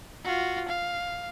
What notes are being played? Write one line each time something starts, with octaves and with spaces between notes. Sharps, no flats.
F4 F#4
F5